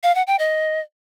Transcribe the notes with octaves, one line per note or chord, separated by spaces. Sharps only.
F5
F#5
G5
D#5